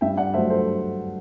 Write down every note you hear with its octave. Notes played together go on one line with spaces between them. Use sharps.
G2 E5 G5
D5 F#5
F#3 A3 C5 E5
A4 C5